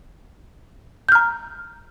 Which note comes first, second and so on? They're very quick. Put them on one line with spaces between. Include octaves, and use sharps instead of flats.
G6 F6 A#5